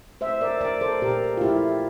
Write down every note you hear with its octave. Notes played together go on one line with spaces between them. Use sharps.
A3 C5 E5
A#4 D5
A3 A#4 D5
A4 C5
A#2 G4 A#4
F4
A3 E4 G4